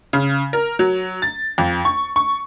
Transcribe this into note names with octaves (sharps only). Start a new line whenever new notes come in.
C#3
A#4
F#3
A6
F2
C#6
C#6